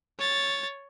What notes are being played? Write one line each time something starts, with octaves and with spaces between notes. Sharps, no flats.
C#5 A6